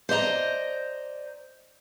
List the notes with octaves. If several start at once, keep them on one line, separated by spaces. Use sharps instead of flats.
C5 D5 D#5 A#5